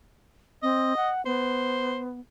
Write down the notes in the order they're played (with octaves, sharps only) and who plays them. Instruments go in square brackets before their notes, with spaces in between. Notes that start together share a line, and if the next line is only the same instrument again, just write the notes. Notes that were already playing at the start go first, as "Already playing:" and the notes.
[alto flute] C4 [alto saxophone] D#5
[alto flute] F#5
[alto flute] B3 [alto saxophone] C5